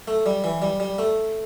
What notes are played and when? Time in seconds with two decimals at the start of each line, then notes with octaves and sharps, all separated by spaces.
0.08 A3
0.26 G3
0.44 E3
0.62 G3
0.80 G3
0.99 A3